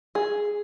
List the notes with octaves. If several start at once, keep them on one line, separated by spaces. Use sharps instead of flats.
G#4